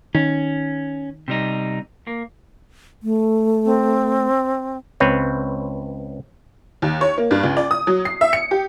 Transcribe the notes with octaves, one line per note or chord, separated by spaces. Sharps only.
D#3 C#4
C3 G3 D#4
A#3
A3
C4
C#2 C4 B4 C#5
D#2
C#5
A#3
G2
C#2
D5
D#6
F#3
C7
E5
C#7
G4